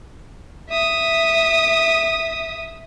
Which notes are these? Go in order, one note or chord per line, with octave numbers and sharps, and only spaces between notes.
E5 D#6